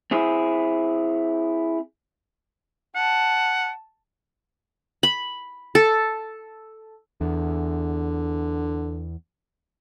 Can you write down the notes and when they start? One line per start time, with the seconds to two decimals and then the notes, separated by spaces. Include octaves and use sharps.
0.11 C4 E4 G#4
2.95 F#5 A5
5.03 B5
5.75 A4
7.21 E2 D3